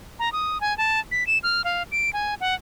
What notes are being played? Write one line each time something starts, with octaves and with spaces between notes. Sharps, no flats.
A#5
D#6
G#5
A5
B6
E7
F6
F5
D7
G#5
F#5